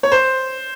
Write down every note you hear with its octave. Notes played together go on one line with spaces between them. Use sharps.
C#5
C5